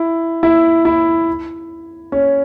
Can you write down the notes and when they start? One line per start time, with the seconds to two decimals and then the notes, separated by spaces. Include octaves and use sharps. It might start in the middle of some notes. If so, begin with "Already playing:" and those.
Already playing: E4
0.43 E4
0.85 E4
2.12 C#4